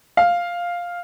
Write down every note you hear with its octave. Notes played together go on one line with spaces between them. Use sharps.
F5